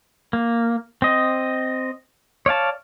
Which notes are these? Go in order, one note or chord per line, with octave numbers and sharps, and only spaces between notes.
A#3
C4 D#5
C#5 D5 F5 A5